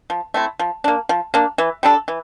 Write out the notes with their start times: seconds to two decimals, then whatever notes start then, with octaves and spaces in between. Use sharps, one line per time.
0.10 F3
0.34 A3 C4 E4
0.59 F3
0.84 A#3 D4
1.09 F3
1.34 A#3 D4
1.58 E3
1.83 G3 D4 A4
2.08 E3